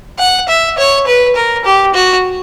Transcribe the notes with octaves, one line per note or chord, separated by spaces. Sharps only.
F#5
E5
C#5
B4
A#4
G4
F#4